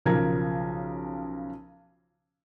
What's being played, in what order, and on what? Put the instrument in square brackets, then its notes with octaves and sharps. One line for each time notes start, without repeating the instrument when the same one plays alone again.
[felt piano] B1 C#3 F3 A#4 A#5 G#6